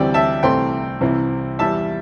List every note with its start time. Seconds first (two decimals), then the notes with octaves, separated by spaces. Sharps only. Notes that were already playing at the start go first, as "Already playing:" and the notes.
Already playing: D2 C3 E3 G3 C4 D5 G5
0.14 E5 A5
0.43 C2 C3 E3 A3 C4 G5 C6
1.01 C2 C3 E3 C4 E4
1.59 E2 E3 G3 E5 A5